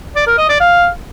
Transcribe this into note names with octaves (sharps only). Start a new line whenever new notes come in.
D5
A#4
D#5
D5
F5